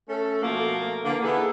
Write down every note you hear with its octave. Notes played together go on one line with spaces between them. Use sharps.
A3 C#4 A4
B2 F3 A3 A#3
D3 E3 A#3
B3 D#4 E4 G#4 A4